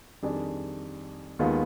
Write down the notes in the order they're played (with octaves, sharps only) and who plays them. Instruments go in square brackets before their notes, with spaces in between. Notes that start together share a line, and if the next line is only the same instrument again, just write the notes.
[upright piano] F2 D#3 G3 D4 G#4
D#2 D#3 G#3 B3 F4